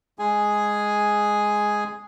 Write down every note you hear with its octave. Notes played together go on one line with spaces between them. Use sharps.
G#3 G#4 G#5